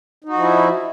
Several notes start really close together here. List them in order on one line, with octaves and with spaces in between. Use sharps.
D#4 F#4 F3 E4